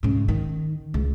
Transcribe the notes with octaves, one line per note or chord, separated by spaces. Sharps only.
G#2 C#3
D#3
C#2